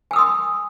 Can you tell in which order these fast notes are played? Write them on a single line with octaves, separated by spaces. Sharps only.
G#5 E6 D#6 C6